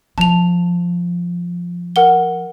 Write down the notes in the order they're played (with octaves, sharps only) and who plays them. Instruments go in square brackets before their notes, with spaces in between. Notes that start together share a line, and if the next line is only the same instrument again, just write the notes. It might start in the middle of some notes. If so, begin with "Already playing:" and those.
[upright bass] F3 [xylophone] A5 F7
[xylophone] A#4 F#5 G7